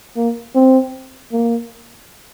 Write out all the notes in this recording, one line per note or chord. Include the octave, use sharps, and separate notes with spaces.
A#3
C4
A#3